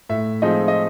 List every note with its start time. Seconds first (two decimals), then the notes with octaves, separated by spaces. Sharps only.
0.09 A2 E5
0.42 F3 G#3 C4 D#4 D#5
0.68 D#5